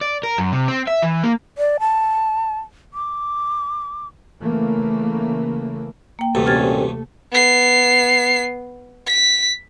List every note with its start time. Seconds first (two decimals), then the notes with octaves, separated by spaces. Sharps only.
0.01 D5
0.23 A#4
0.38 F#2
0.52 C3
0.68 C4
0.88 E5
1.03 E3
1.24 A#3
1.58 D5
1.80 A5
2.94 D6
4.40 C#3 E3 A3 A#3
6.19 A#3 G5
6.35 A1 D2 G2 C3 A3 A4
6.46 A#2 C4 C#4 F6 G#6 A6
7.32 B3 C7
9.07 B6